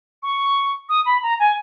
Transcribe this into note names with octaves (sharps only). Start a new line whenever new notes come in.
C#6
D#6
B5
A#5
G#5